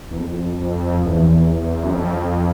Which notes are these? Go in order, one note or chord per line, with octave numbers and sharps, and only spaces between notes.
E2
F2
E2
F#2
F2